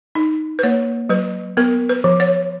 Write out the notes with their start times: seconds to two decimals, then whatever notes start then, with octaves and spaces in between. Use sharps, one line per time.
0.15 D#4
0.59 B4
0.63 A#3 C#5
1.09 F#3 B4
1.57 B3 A#4
1.89 B4
2.04 F3
2.20 C#5